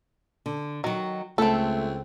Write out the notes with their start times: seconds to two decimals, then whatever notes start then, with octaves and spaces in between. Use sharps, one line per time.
0.46 D3
0.84 D#3 F#3 F#4
1.38 C#2 A3 C4 A4 E5